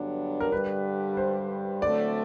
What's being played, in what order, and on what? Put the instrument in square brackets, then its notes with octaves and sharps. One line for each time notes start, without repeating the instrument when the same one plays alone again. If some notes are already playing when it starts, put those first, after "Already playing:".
Already playing: [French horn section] G2 D3 F#3 B3 D4
[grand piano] A#4
[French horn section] G2 D3 G3 [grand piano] B4
[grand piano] C5
[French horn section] D3 F#3 A3 C4 [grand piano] D5